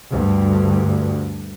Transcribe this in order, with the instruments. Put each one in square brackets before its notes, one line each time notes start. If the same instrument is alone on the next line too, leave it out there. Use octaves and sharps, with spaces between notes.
[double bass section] D2 G2